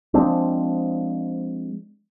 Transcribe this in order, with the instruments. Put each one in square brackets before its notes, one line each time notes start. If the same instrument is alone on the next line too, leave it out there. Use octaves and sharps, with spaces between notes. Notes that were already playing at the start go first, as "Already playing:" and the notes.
[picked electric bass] F3 G#3 C4 D4